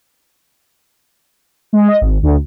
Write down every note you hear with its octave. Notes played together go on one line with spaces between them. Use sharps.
G#3
D#5
G#1
D2